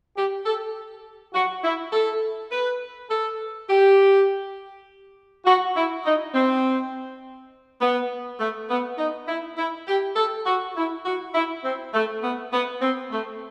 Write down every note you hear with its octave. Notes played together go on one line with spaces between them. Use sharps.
G4
A4
F#4
E4
A4
B4
A4
G4
F#4
E4
D#4
C4
B3
A3
B3
D#4
E4
E4
G4
A4
F#4
E4
F#4
E4
C4
A3
B3
B3
C4
A3